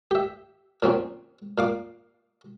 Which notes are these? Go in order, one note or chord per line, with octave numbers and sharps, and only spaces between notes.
G4 E5
A#2 F#3 C4 C#4
A#2 F5 D6